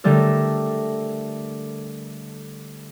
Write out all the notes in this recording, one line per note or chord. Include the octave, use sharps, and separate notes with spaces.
D3 G3 A3 A4 A#4